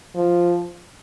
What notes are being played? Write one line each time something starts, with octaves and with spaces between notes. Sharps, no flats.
F3